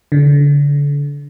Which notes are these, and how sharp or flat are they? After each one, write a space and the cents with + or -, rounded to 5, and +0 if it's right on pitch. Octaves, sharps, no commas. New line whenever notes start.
D3 -35